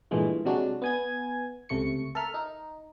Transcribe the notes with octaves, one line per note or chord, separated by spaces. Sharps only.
G2 A#2 E3 G#3 A3
C3 F#3 G#3 D4 F#4
B3 G#5 G#6
C#2 C3 A3 C#6 C#7
A4 A#4 E5 F6
D#4